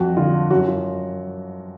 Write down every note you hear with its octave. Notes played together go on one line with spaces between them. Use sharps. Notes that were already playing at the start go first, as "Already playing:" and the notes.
Already playing: F2 F#4
D3 F4
F#2 F#4
F4